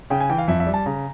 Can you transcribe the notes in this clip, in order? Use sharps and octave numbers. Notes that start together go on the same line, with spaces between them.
C#3 G5
G#5
E3 G5
F5
F2 E5
E5
G3
A5
C#3 A#5